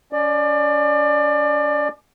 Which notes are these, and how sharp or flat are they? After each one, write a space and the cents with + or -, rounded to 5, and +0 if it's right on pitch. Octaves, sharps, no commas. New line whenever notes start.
C#4 +45 D5 +25